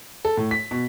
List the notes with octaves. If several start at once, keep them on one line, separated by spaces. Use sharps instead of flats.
A4
A2
B6
B2